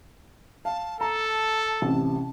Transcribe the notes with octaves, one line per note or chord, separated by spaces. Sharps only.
F5 A5
A4 A5 A#5
A1 C3